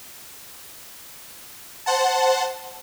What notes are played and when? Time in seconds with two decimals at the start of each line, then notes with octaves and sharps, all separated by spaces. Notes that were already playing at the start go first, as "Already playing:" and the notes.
1.86 C5 F#5 A5